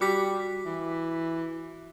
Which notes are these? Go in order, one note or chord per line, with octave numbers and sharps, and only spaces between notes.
G3 F#4 D6 B6
E3